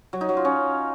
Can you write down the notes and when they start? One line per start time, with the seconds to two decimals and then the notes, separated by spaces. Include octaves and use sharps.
0.13 F#3
0.21 D#4
0.29 F#3
0.37 F4
0.45 C#4